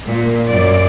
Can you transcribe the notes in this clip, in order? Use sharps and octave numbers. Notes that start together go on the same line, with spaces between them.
A#2
F#2 D5